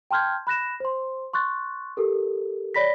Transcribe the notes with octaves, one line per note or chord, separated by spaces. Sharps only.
G5 A5 C6 F6 G6 G#6
B5 F#6 A#6 E7
C5 C6
C6 C#6 F#6 A6
G4 A4 A#4
C#5 D5 B5 A#6 B6